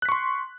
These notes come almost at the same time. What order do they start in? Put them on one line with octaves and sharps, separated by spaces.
F#6 B6 C#6 C6